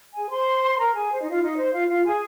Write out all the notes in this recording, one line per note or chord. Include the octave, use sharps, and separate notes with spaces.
G#4 G#5
C5 C6
A#4 A#5
G#4 G#5
C5
D#4 D#5
F4 F5
D#4 D#5
C5
F4 F5
F4 F5
G#4 G#5